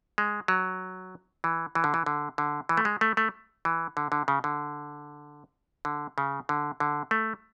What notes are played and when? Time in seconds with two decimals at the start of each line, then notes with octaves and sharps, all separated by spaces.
0.18 G#3
0.48 F#3
1.44 E3
1.75 E3
1.84 D3
1.94 E3
2.06 D3
2.38 D3
2.69 E3
2.77 A3
2.85 G#3
3.01 A3
3.17 A3
3.65 E3
3.97 D3
4.12 D3
4.28 C#3
4.44 D3
5.85 D3
6.18 C#3
6.49 D3
6.80 D3
7.11 A3